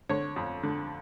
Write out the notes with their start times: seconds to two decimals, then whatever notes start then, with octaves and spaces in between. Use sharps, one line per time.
0.09 D3 C#5
0.36 F2
0.63 D3